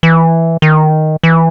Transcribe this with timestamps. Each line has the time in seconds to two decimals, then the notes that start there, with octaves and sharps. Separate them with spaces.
0.03 E3
0.62 D#3
1.23 E3